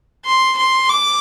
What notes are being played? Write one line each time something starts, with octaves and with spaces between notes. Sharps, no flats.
C6
C6
D6